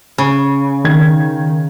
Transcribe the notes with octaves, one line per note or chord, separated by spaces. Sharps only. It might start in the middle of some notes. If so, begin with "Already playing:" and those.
C#3
D#3 G#6